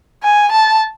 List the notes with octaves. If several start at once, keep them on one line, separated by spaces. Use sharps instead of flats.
G#5
A5